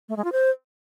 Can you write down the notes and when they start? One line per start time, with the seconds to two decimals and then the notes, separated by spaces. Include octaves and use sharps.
0.09 A3
0.17 G#3
0.24 F4
0.32 C5